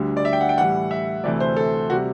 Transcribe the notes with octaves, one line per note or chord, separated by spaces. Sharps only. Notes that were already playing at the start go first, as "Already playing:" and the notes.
Already playing: D2 D3 G3
D5
E5
G5
F#5
G5
A2 E3 G3 F#5
E5
D2 C3 E3 A3 D5
C5
A4
C3 G3 F#4